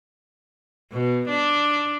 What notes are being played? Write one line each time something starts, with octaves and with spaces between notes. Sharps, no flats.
B2
D4